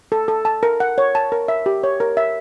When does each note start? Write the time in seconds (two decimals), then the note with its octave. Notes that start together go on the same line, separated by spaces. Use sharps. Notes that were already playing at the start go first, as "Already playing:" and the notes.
0.12 A4
0.28 A4
0.45 A5
0.63 A#4
0.80 F#5
0.98 C#5
1.15 A5
1.32 A#4
1.48 E5
1.66 G4
1.83 C#5
2.00 A#4
2.17 E5